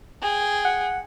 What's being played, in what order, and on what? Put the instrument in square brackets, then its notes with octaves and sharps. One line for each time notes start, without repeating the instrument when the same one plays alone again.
[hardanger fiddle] G#4 G5
[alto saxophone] F#5